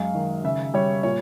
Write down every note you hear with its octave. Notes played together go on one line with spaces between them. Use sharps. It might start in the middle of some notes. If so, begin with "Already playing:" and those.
Already playing: F#2 G#3 F5
D#3
C#3 E5
G3 C#5
A#2 C#5